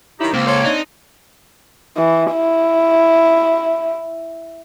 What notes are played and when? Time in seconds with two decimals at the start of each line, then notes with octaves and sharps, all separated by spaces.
0.20 D#3 F#3 D#4 E4 G4
0.34 C#2 A#3 C4
0.47 A4 C5 C#5
0.64 C4 D4 D#4
1.97 E3
2.33 E4